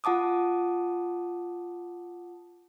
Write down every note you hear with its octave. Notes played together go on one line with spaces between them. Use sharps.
F4 F#5 A5 D6 D#6